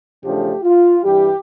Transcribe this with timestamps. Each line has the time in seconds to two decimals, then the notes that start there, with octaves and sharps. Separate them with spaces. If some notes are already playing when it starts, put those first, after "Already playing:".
0.24 E2 C#3 F3 A3 D4 G4
0.63 F4
1.02 G2 E3 G3 G4